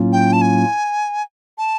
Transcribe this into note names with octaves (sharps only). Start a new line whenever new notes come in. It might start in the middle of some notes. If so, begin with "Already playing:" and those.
Already playing: A2 F#3 A#3 C#4 F4
G5
A5
G#5
A5